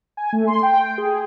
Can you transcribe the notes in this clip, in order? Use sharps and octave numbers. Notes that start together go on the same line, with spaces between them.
G#5
A3
C6
G5
G#4